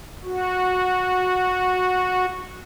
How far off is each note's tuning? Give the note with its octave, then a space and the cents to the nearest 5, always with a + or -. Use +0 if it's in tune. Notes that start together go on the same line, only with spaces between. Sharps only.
F#4 -15